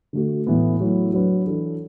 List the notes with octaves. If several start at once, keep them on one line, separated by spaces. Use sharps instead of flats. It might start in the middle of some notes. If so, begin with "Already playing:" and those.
D3 A3 F#4
A2 E3 B3
F#3 A3 E4
F#3 D4 B4
E3 D4 A4